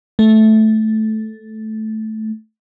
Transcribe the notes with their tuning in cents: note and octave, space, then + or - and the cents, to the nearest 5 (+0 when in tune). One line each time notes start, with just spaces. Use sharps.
A3 -10